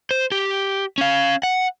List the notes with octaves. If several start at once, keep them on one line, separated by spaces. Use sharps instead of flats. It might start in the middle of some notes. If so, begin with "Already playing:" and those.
C5
G4
C#4 F5
F#5